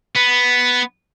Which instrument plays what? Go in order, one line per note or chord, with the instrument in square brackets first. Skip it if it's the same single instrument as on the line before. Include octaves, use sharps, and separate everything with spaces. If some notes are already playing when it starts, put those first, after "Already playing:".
[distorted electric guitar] B3